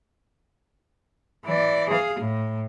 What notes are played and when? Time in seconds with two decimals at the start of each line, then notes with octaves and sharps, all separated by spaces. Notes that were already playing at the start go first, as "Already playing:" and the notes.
1.45 E3 D5
1.89 G#4 F5
2.19 A2